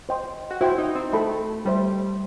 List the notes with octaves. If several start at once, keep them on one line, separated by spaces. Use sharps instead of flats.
C5 D#5 G5 C6
F#4
E4 F#4 C5 E5 G5
D#4
C4
A3 A4 E5 B5
G3 G4 C5 E5